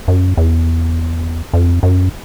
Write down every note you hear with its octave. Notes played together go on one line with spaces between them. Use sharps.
F#2
E2
F2
F#2